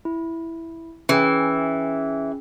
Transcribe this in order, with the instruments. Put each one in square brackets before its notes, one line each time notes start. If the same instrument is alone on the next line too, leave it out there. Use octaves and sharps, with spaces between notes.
[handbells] E4
[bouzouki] E3 [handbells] C#4 G#4 G5